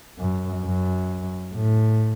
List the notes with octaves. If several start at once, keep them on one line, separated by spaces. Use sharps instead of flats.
F#2
F#2
A2